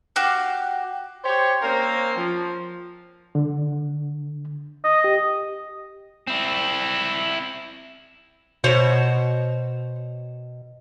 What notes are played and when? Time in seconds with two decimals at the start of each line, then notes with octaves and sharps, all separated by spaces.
0.16 F#4 G4 F5
1.25 G4 C5 C#5
1.62 A#3 C4 C#4 A#4 C5 F5
2.15 F3
3.35 D3
4.84 D#5
5.04 G4
6.27 C4 E4
8.64 B2 F#4 C5 C#5